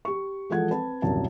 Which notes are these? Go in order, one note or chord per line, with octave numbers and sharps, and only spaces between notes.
G4 C#6
E3 F3 G#3 A4 F#5 G#6
C4 B4 A5
D#1 C2 F#2 D3 A5